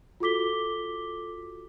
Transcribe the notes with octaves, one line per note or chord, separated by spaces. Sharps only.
F4 F#4 A4 D6 B6 G7